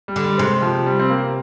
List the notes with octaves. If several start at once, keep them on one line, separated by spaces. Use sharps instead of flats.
G3
D3
G3
C3 G#3
F3
G3
C4
A#3